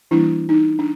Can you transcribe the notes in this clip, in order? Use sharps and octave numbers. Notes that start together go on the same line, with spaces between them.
E3 G3 A#3 D4 E4
D#4
D4